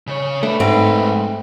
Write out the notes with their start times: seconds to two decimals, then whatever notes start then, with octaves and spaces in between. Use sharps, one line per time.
0.07 C#3 C#5
0.43 A3 D4 B4
0.60 F2 G#2 C4 B4